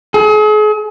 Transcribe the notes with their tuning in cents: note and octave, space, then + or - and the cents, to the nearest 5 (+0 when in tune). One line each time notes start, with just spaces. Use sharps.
G#4 +40